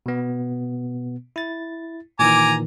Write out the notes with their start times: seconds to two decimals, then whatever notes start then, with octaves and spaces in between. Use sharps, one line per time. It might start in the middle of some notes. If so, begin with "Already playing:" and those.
0.06 B2 B3
1.36 E4 A6
2.19 A#2 D#3 E3 G#5 A#5 D6